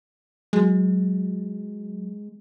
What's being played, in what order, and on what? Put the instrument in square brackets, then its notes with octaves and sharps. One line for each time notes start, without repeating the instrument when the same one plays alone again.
[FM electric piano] F#3 [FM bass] G#3